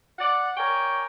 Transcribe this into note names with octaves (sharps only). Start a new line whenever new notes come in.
D5 F#5
A#4 C#5 D5 G5 G#5